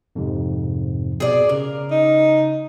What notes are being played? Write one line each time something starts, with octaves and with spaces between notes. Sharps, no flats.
F2 G#2 C3
B2 G#4 D5
C#3 A#4
D#4